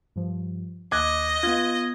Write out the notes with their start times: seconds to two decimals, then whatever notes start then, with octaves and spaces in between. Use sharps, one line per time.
0.16 G2 F3
0.92 D#2 D#5 D6 F#6 G#6
1.43 B3 F4 G#6